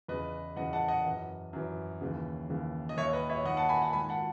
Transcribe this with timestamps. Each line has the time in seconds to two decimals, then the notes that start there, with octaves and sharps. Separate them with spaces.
0.08 E2 C#3 E3 B4 D#5
0.56 E2 C#3 E3 D#5 F#5
0.73 F#5 A5
0.88 D#5 F#5
1.05 F#2 E3
1.53 F#2 E3
2.01 D#2 C#3 E3
2.49 D#2 C#3 E3
2.89 D#5
2.97 D#2 D#3 C#5 E5
3.13 B4 D#5
3.29 C#5 E5
3.45 D#2 D#3 D#5 F#5
3.57 F#5 A5
3.69 G#5 B5
3.82 F#5 A5
3.93 G#2 D#3 G#5 B5
4.09 F#5 A5